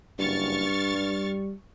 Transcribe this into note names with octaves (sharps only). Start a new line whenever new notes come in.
F#1 G2 C#6 F6 A6
G3